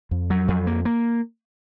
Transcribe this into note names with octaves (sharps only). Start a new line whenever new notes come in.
F2
F#3
F2
A#3
A#3